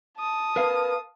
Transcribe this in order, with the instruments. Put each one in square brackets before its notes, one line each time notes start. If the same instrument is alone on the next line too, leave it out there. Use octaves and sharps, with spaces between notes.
[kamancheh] A5 D#6
[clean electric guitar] A#4 B4 F5